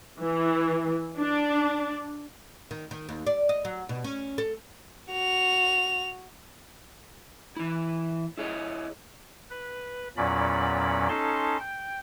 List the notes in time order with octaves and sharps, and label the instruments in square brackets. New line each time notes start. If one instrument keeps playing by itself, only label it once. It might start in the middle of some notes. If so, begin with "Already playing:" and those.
[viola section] E3
D4
[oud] D#3
D#3
D#2
D5
D#5
F#3
B2
C#4
A4
[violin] F#4 F7
[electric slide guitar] E3 E4
E4 G#4 C#5 D#5
[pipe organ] B4
E2 A#2 F#3 C#4 D5 B5
C#4 D#4 A4 A5 C6
G5